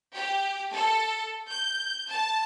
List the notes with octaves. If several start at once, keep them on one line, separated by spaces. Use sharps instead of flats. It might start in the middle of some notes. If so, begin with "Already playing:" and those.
G4
A4
G6
A5